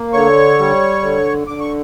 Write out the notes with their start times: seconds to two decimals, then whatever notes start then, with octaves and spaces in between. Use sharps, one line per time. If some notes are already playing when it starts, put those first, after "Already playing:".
Already playing: A#3
0.13 D3 C#5 C#6
0.59 G3
1.02 D3
1.47 D3 D6
1.60 C#6